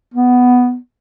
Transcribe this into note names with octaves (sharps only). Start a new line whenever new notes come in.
B3